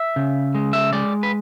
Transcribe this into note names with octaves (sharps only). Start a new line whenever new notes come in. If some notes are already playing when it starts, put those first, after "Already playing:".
Already playing: E5
C#3
G#3
E5
G#3 D5
B4